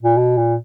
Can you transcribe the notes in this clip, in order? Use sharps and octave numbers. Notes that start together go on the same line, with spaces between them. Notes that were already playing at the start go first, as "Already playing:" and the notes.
A#2
B2
A#2